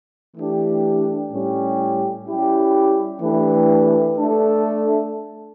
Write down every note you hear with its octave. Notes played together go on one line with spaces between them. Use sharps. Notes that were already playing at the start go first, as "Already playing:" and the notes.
E3 A3 D4 G4
A2 G3 C#4 G4
G3 C#4 E4 G4
E3 A3 D4 G4 B4
A3 D4 A4